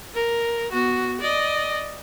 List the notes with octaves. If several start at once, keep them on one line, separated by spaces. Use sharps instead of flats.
A#4
B3 F#4
D5 D#5